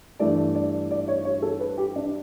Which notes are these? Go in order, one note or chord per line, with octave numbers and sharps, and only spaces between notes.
G2 E3 A3 D5
D5
D5
C#5
C#5
A4
B4
G4
D4